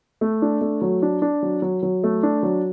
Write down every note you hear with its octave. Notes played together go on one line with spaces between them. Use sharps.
A3
D4
A3
F#3
D4
D4
F#3
F#3
F#3
A3
D4
F#3